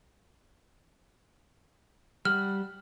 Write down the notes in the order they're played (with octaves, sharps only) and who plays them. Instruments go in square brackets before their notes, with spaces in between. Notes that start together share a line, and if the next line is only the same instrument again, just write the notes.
[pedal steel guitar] G3 F#5 [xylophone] F6